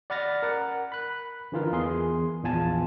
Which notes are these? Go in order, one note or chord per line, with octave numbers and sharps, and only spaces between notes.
D5 F#5 B5 F6 A6 A#6
A#4 F#5
B5 F#6
D3 E3 F4 A#4
E2 G#4 C6
A#1 E2 F4 G#5 A5